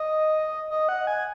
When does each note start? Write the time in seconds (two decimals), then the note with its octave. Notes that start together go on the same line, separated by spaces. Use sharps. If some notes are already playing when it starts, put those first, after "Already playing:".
Already playing: D#5
0.70 D#5
0.89 F#5
1.07 G#5